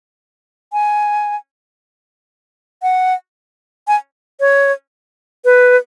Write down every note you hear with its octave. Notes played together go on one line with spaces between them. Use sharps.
G#5
F#5
G#5
C#5
B4